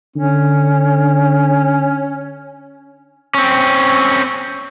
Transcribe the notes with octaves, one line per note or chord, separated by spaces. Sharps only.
D3 C#4
C4 C#4